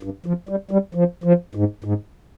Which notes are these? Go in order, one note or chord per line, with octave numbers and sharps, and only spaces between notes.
G2
F3
G3
G3
F3
F3
G#2
G#2